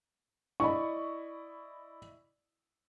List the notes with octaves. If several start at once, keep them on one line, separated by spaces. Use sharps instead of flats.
E4 D5 D#5 B5 C#6